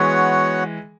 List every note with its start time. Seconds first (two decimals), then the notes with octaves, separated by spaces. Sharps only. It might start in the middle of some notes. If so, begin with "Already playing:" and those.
Already playing: E3 G#3 B3 F#4 C#5 F#5